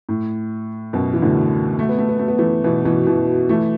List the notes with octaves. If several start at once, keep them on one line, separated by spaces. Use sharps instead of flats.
A2
F#2 B2
E3
A2 D3
A3
B3
A3
B3
A3
B3
E3 A3
B2 E3
B2 E3
B2 E3
E3 A3